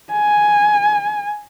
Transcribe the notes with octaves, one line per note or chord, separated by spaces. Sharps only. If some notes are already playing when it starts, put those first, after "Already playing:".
G#5